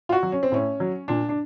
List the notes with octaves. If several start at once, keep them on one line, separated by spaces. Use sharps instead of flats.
F4
F#4
F#3
C#4
C4
A2 C#4
F#3
A#2 D4
D4